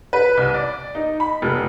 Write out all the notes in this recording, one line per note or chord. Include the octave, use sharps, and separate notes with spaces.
B4
C2
D5
D#4
B5
F1